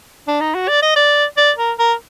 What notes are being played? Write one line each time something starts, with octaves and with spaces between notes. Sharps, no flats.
D4
D#4
F#4
D5
D#5
D5
D5
A#4
A#4